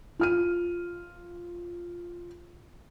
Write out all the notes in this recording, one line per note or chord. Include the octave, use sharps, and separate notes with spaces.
F4 F6 D#7